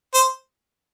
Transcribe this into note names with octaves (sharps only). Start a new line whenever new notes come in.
C5